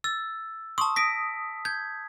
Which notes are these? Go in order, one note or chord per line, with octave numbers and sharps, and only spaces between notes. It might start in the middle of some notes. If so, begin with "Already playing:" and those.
E6 A6
A5 C6 C#6 D#6
D#6 A#6 B6 D7
G6 G#6